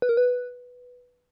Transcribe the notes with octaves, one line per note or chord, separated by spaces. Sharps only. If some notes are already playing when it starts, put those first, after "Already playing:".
B4
A#4
B4